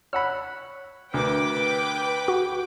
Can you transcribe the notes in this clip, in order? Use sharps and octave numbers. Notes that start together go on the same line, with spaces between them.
C#5 F#5 B5 E6
D2 A#4 B4 G5 D6
F#4